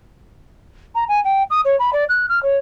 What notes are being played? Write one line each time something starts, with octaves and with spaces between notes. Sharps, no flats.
A#5
G#5
G5
D#6
C#5
B5
D5
F#6
F6
C#5